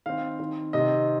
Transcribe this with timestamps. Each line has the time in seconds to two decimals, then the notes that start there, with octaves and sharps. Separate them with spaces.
0.06 D#3 C4 F5
0.39 D#3 C4
0.73 C3 D#3 C4 D#5